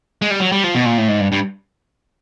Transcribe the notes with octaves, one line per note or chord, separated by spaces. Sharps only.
G#3
G3
F#3
G3
F3
B2
A#2
A2
G#2
G2
G2